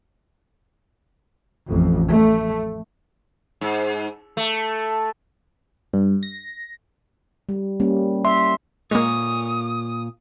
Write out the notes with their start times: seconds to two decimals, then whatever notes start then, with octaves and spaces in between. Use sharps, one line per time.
1.68 A1 F2
2.10 A3
3.61 G#2
4.37 A3
5.93 G2
6.23 A#6
7.49 G3
7.80 G3 A#3 C#4
8.25 E5 C6
8.91 A#2 G#3 A#3 C#5 D#6